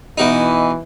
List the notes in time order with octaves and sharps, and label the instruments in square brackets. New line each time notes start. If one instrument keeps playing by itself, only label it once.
[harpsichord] B2 D#4 [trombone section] E3